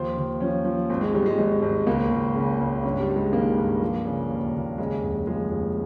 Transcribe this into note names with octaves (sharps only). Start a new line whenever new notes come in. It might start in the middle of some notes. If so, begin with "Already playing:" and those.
Already playing: D#2 F3 C5
D#2
F3 C#4
F3
G#1 C4
G#3
G#1 G3
G#3
G#1 G#3
G#1
C#2 A#3
C#2
C#3
C#2
G2 C#4
G3
G2
G#3
D#3 A#3
G2
F3
C#3
D#2
D#2
C#3 G#3
F1
F3 G#3
F1